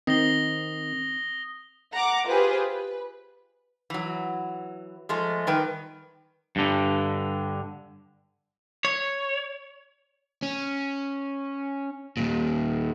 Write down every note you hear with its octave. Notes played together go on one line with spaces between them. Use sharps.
D#3 C4 D#6 A#6 G7
F#5 A#5 D6
F4 G4 G#4 B4 C5
B4
E3 F#3
F3 G#3 A3
D#3 G3 B4 G5
G2 D3
C#5
C#4
D#2 A#2